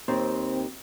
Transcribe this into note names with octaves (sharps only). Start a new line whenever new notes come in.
D#2 C4